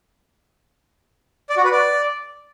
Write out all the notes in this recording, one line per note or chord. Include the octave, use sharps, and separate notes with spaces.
D5
F#4
B4
D5